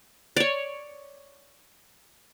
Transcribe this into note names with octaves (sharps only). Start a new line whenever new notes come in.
C#5 D5